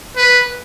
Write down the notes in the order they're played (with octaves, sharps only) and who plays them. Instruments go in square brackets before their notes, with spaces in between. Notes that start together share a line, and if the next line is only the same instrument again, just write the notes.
[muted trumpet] B4